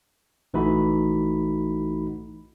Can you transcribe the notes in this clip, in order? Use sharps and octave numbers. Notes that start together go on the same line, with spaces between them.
A#1 E3 A3 D#4 F#4 B5